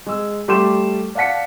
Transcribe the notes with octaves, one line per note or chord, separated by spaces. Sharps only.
G#3 E6
G3 A3 G4 C6 G6 E7
D5 F5 F#5 A5 B6 C#7